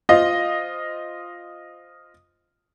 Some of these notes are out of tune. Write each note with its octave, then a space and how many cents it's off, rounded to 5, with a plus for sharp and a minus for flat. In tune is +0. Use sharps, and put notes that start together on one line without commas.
F4 +0 C5 -5 D#5 +0